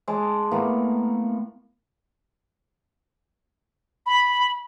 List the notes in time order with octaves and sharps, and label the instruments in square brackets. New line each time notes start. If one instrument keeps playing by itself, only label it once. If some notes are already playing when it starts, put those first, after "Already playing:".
[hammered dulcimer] G#3 A5 C6 D6
A2 A#3 B3
[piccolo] B5